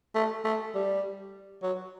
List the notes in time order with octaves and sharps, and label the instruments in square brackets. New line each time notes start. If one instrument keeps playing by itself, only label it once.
[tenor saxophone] A3
A3
G3
F#3